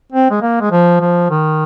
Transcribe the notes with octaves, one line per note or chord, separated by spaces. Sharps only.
C4
G#3
A#3
G#3
F3
F3
D#3